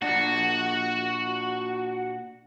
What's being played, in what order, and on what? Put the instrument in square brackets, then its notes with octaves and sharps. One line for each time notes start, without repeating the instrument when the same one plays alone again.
[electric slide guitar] A#2 D4 D5 [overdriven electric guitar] F#4